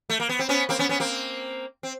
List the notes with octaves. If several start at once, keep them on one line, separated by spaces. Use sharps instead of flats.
A3
A#3
B3
C4
B3 C#4
A#3 C4
B3 C#4
B3 C#4
A#3 C4
C4